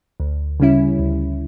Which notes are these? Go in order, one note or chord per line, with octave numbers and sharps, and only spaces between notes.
D2
C#3 G3 C#4 E4
D2